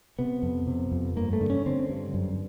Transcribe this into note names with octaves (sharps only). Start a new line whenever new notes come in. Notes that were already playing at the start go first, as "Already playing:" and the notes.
C3 B3
F2
C3
F2
G2 A#3
A3
D3
C#4
D3 C4
G2
F#2